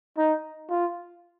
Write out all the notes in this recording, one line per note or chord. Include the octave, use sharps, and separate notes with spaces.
D#4
F4